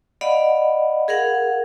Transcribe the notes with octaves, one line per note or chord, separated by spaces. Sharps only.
D5 D#5 F5 F#5 B5
G#4 A#4 F5 F#5